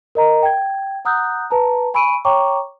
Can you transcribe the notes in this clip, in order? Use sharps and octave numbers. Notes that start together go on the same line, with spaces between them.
A#4 D#5 A#5
G5 G#6
F#5 A#5 D#6 E6 F#6 G6
B4 A5 A#5
G#5 B5 C#6 E6 D7 D#7
C#5 G5 A#5 C#6 D6